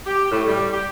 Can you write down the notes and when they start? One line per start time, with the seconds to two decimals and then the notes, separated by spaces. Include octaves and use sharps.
0.06 G4
0.31 A2
0.48 G3
0.72 G4